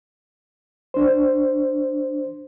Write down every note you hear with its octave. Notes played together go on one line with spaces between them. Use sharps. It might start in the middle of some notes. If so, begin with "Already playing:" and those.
D4 C5